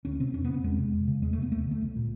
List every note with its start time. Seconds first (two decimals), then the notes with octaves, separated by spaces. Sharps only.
0.05 D2 C#4
0.20 C3 C4
0.34 F2 C#4
0.45 B3
0.49 C#3
0.54 C4
0.64 E2 G#3
0.78 C3
0.93 F2
1.08 C#3
1.22 E2 G#3
1.33 A3
1.37 C3
1.42 B3
1.52 D#2 A3
1.66 D3 A3
1.81 C2
1.96 A#2